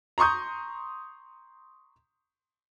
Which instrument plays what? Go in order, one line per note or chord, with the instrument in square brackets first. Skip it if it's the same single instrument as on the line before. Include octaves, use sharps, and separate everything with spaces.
[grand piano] A#5 C6 C#6 D#6 G6